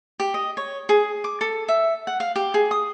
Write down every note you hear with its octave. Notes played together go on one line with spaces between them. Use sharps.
G4
D#5
C#5
G#4
D6
A4
E5
F#5
F5
G4
G#4
D#6